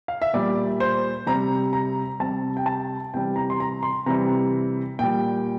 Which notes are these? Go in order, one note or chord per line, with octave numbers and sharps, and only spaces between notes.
F5
E5
A#2 G3 D5
C5
C3 G3 A#5
A#5
C3 G3 A5
G5
A5
C3 E3 G3 G5
A#5
C6
A#5
C6
C3 E3 G3 A#5
A#2 G3 G5